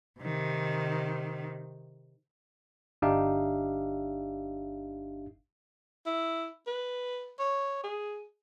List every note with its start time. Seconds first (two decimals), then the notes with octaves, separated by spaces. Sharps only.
0.20 C3 D#3
3.02 G1 D4 D#4 G4 E5 F5
6.07 E4
6.67 B4
7.39 C#5
7.84 G#4